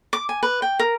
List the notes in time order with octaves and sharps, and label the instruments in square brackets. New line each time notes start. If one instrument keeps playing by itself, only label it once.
[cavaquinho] D6
G#5
B4
G5
A#4